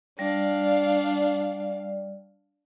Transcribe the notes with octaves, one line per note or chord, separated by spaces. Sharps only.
G3 D4 D5 F5